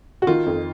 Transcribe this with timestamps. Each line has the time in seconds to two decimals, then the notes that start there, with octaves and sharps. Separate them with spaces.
0.22 F#4
0.27 D#3 F4
0.46 F2